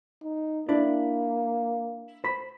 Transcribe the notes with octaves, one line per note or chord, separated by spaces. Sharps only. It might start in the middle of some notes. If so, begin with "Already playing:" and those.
D#4
A#3 D4 E4 D5
C5 B5